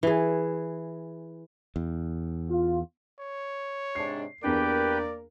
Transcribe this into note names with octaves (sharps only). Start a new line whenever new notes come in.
E3 G#4
E2
F4
C#5
G#2 C3 D4 C7
E2 A#3 D4 G4 A#4 B4 D5 G5